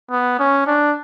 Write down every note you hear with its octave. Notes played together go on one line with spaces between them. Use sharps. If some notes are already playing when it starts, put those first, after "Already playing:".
B3
C#4
D4